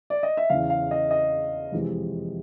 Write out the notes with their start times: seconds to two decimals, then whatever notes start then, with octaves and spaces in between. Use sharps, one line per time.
0.10 D5
0.23 D#5
0.37 E5
0.50 E2 C#3 E3 F5
0.70 F5
0.91 D#5
1.11 D#5
1.72 F2 C3 E3 G#3